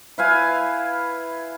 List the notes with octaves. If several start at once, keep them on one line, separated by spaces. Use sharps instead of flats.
E4 B4 F5 G#5